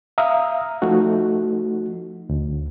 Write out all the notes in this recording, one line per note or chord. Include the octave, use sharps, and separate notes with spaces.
E5 F5 A#5 D#6
F3 A3 D#4 F#4
D2